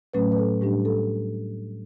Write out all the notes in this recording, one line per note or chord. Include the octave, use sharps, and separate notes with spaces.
A2 F#3 A3 C#4 B4
B4
A4
A2 G3 D4 G4
A4